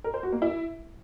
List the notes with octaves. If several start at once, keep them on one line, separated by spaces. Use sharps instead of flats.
A#4
C5
F#4
A#3
E4